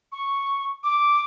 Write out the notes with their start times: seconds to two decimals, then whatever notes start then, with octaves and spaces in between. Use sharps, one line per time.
0.12 C#6
0.83 D6